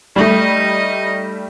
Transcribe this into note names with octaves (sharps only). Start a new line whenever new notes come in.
G3 A3 D#4 D#5